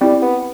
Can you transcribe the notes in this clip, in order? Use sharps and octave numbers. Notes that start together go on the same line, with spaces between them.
G3 C4 E4 G4
B3